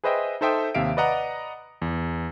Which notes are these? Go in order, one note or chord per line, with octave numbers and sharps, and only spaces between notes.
G#4 B4 C5 D#5 E5 G5
D#4 A4 C5 E5 G5 D#6
D#2 C3 E5 F5 D7
B4 D5 D#5 F#5 A#5
E2